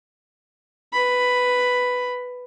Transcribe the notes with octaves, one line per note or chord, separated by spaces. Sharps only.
B4 B5